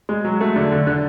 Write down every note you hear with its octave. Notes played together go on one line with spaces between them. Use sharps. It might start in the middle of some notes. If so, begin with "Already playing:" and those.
G#3
F#3
A3
D3
D3
D3